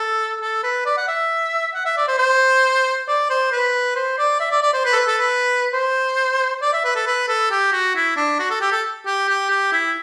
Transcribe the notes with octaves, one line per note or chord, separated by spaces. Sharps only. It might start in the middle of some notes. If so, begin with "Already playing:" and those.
Already playing: A4
A4
B4
D5
F#5
E5
F#5
E5
D5
C5
C5
D5
C5
B4
C5
D5
E5
D5
D5
C5
B4
A4
B4
A4
B4
C5
D5
E5
B4
A4
B4
A4
G4
F#4
E4
D4
F#4
A4
G4
A4
G4
G4
G4
E4